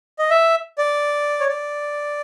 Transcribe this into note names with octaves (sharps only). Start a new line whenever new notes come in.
D#5
E5
D5
C#5
D5